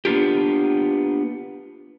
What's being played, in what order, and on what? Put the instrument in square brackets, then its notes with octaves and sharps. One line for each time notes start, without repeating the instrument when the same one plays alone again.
[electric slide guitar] A#3 B3 D4 F4 G4